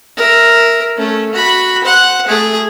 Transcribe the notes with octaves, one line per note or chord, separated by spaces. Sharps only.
A#4 E5
A3 C#4
F#4 B5
C5 F#5
A3 G#4